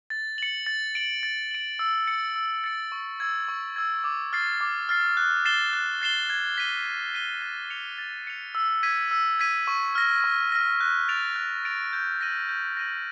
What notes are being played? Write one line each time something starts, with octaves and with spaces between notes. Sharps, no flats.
A6
C#7 F#7
A6
D7 F#7
A6
D7 F#7
E6
A6 C#7
E6
A6 C#7
C#6
E6 G#6
C#6
E6 G#6
D6
F6 A6 C7
D6
F6 A6 C7
F#6
A6 C7 E7 G7
F#6
A6 C7 E7 G7
G#6
B6 D#7 G7
G#6
B6 D#7 G7
A6
C#7 F7
A6
C#7 F7
E6
G#6 B6 D#7
E6
G#6 B6 D#7
C#6
F6 A#6
C#6
F6 A#6
F#6
A6 D7 F7
F#6
A6 D7 F7
G6
A#6 D#7 F#7
G6
A#6 D#7 F#7